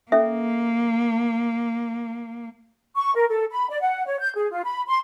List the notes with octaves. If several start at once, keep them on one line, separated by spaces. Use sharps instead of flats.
A#3 C#4 A4 E5
C#6
A#4
A4
B5
D5
F#5
C#5
G6
G#4
F4
B5
C6